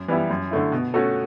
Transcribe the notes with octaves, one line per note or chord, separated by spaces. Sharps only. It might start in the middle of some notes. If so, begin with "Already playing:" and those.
Already playing: F#2
E3 G3 B3 E4
F#2
D3 A3 E4
B2
A3 C#4 F#4 A4